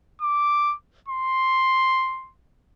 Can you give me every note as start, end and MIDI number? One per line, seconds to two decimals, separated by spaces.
0.22 0.75 86
1.08 2.31 84